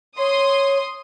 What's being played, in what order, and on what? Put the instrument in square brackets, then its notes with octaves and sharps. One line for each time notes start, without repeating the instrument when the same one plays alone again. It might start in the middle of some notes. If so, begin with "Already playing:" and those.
[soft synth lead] C#5 [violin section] C6 D#6